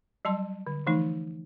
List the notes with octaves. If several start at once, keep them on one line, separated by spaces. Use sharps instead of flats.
F#3 G3 A5 C6
D3
E3 F3 A3 D#4